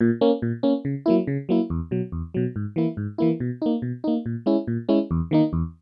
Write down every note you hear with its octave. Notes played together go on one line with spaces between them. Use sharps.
A#2
A#3 C#4
A#2
A#3 C#4
C#3
F#3 A#3 E4
C#3
F#3 A#3 E4
E2
B2 F#3
E2
B2 F#3
G#2
E3 A#3 E4
G#2
E3 A#3 E4
B2
A#3 D#4
B2
A#3 D#4
A#2
G#3 C#4 E4
A#2
G#3 C#4 E4
E2
D#3 A#3 D#4
E2